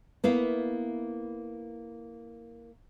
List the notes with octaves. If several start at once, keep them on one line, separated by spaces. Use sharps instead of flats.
A#3 B3 E4 F5